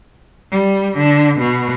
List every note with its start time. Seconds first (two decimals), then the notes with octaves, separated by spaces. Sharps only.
0.52 G3
0.97 D3
1.40 B2